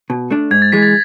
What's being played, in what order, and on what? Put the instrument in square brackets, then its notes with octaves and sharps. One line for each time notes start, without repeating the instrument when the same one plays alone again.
[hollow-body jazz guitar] B2
A3 D4
[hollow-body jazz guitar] G#2 [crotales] G#6
[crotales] A6
[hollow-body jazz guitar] E3 G#3 [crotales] B6
[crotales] A6